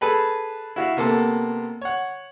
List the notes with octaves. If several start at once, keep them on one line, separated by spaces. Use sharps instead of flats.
G#4 A4 B4 B5
E4 F#4 E5 F5
C3 A#3 B3 A4
C#5 F#5